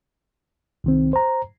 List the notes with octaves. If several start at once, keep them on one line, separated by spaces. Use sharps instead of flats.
C2 D#3 C4
C5 A#5